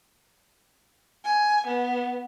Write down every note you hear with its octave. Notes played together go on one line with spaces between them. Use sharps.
G#5
B3